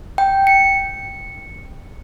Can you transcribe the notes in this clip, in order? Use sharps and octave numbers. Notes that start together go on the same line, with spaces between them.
G5
C#7